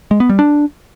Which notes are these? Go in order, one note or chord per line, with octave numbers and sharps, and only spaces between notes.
G#3
B3
G3
D4